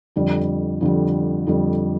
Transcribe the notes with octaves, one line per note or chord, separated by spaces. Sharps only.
F2 D3 G3
F2 D3 G3
F2 D3 G3